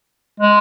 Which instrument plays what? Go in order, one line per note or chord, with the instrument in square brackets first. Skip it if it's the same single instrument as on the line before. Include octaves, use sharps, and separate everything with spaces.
[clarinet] G#3